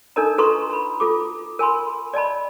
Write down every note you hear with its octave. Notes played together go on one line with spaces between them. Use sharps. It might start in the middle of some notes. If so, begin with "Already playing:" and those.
D4 D#4 A4 A#4 D#5 A#5
F4 A4 B4 A#5 C6 C#6
A#5 B5
F4 A4 D6
A#4 G#5 B5 C6
D5 D#5 A5 B5